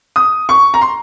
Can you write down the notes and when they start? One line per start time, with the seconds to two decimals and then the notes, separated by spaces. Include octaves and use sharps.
0.16 D#6
0.49 C#6
0.74 A#5
0.81 C6